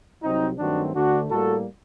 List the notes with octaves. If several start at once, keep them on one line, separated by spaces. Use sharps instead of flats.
C2 C3 F#3 C4 D#4
G2 D#3 F#3 A3 C4 D4 F#4
D2 D3 A3 D4 F#4
A2 G3 A#3 F#4 A4